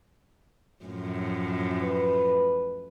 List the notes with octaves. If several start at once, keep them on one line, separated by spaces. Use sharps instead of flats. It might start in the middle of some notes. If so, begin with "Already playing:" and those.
F#2 A2 F3
B4